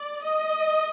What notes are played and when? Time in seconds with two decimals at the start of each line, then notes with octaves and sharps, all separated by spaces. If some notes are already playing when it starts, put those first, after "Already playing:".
Already playing: D5
0.23 D#5